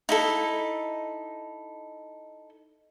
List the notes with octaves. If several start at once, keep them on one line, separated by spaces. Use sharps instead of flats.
D#4 E4 A4